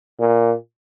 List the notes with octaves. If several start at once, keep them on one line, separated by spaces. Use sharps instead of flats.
A#2